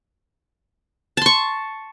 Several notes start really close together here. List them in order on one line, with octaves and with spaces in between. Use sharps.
A5 C6 C#6